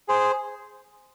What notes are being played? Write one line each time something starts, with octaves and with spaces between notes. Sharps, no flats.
G#4 C5